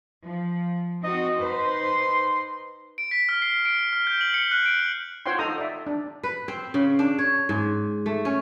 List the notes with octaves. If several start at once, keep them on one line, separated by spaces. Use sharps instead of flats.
F3
C4 D#4 F#4 D#5
D#4 B4 C5 C6
D7
B6
F6
C7
D7
F6
G6
F#7
C#7
F#6
D7
F#7
F4 C5 C#5 F#5 G5 C6
D#4 A4 A#5 D#6
D5 E5
D4
B4
C4
C#3
D4
C#5
G#2
A3
C#4